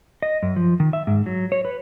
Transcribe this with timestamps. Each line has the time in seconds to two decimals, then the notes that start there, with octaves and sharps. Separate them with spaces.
0.22 D#5
0.43 F#2
0.56 F3
0.80 D#3
0.93 E5
1.07 G#2
1.26 F#3
1.52 C#5
1.65 B4